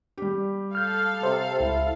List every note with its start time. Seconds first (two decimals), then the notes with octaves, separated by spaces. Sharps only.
0.18 G3 G4
0.75 A4 F5 F6 G6
1.23 C3 C5
1.60 C#2 E4